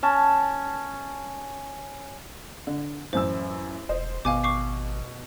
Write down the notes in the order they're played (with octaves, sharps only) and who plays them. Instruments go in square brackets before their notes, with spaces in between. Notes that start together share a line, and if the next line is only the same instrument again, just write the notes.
[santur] C#4 A5
[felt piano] D3
[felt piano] A1 F#2 E6 [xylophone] C5
[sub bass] E1 [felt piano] C5 D#5
[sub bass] G#1 [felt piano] B2 [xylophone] F5 G#5 D6
[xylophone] C#6 D6 C7